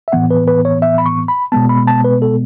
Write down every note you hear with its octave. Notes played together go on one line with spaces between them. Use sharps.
E5
A2 E3 B3 F#5
B4
B4
C#5
E5
B5
C#6
B5
B2 G#3 B3 A5
B5
A5
B4
A4